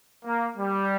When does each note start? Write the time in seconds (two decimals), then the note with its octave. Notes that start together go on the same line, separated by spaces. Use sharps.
0.24 A#3
0.57 G3